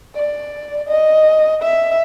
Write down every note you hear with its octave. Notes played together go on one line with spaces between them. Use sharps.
D5
D#5
E5